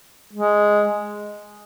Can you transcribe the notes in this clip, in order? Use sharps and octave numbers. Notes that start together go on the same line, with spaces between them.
G#3